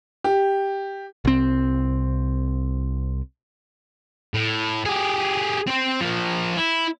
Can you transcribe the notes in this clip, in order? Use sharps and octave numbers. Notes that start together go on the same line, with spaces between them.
G4
C2 C4
A2
G4 G#4
C4 C5
F3 A#4
E4